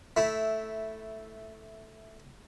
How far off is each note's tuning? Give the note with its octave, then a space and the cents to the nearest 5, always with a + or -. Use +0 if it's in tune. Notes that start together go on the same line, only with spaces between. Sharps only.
A3 +0 E4 -5